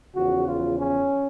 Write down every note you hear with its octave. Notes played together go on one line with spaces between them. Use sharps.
E2 C#3 F3 F#4
F4
C#4